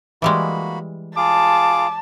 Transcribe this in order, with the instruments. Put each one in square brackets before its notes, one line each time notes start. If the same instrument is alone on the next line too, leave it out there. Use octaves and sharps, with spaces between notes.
[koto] E3 G3 G#3 [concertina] A#3 F#4 B5
[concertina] F4 G#4 F5 [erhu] A5 [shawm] D6